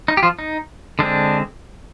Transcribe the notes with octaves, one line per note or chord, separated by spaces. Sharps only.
D#4
G4
F3 F4
D#4
D3 G#3 C4 D4